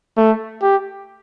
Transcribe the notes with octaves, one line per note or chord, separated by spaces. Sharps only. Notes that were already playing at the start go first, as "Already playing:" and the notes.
A3
G4